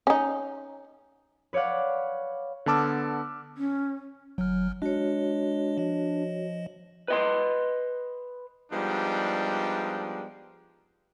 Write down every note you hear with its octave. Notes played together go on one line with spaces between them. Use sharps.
C#4 D#4
B4 C#5 D5 F5 F#5
D3 B3 A5 D6 E6 F6
C#4
G1 F#3 F6
G#3 D4 F#4 C#5 D#5
F3 D#5
B4 D#5 C6
F3 G3 G#3 B3 D4 D#4